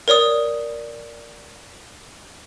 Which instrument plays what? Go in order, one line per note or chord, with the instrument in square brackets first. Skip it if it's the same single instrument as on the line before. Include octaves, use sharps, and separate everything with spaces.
[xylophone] A#4 C#5 D5 D#6